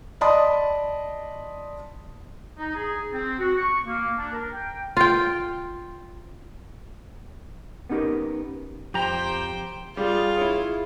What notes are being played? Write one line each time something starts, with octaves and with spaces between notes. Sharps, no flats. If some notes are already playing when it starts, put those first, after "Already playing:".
D5 D#5 A5 B5 C6 D#6
D#4
G#4
C4
F#4
C#6
A#3
D4
A#4
G5
F4 G5
B3 C#4 D#4 G4 A#4
F2 G4 C5 G5 A#5
G3 F4 G#4
E4 C#5